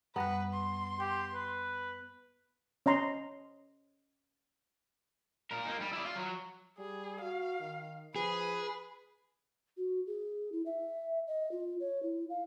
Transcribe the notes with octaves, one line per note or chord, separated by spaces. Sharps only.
F#2 G3 B3 B4 F#6
C6
G4 G5
B4
C#4 D#5 A#5 C6
A#2 A#4
A#3 D#4
G3
E4 D5
F4
F#3
G3 G#4
F#4 F5
D#3
F3 G#4 B4
F#4
G#4
E4
E5
D#5
F4
C#5
E4
F5